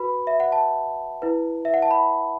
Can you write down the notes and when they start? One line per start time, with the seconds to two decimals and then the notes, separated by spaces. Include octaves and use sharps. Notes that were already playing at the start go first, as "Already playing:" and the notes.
Already playing: F#4 B4 B5
0.27 E5
0.40 F#5
0.52 A5
1.22 E4 B4
1.65 E5
1.74 F#5
1.82 A5
1.91 B5